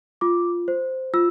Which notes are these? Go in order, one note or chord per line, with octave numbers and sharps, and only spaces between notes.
F4 D6
C5
F4 E6